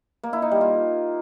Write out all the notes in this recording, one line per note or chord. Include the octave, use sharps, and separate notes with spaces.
A#3
E4
D#4
G3
F4